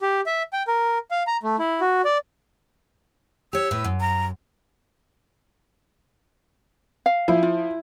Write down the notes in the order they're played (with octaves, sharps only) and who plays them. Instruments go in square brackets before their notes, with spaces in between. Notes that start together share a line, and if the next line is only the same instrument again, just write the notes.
[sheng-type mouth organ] G4
E5
G5
A#4
F5
A#5
A3
E4
F#4
D5
[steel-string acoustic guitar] G4 C#5 [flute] E6
[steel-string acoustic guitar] A2 B4
F#2
[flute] A#5
[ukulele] F5
[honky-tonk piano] F3 [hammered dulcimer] E4
[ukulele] F4